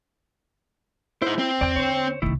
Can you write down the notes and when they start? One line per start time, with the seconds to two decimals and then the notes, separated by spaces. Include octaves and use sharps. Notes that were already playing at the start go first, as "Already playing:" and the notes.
1.22 D#4 E4 C5
1.39 C4
1.61 E2 D5 G5
1.76 D3 C5 C#5
2.22 C2 C3 D#3 A3 E4